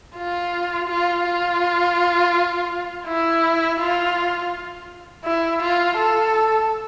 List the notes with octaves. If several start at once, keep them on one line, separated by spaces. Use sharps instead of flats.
F4
F4
F4
E4
F4
E4
F4
A4